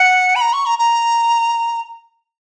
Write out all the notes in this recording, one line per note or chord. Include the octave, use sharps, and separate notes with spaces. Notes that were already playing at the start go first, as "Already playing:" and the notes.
Already playing: F#5
B5
A#5
C#6
A#5
A#5